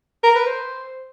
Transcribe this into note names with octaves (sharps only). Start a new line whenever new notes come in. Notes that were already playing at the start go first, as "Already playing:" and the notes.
A#4
B4
C5